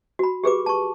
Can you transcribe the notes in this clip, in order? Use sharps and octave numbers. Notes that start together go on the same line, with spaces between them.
F#4 B5
G4 G#4 B4 D6
A5 C#6